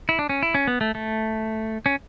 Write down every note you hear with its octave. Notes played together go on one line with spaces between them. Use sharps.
E4
D4
C#4
E4
C#4
B3
A3
A3
C#4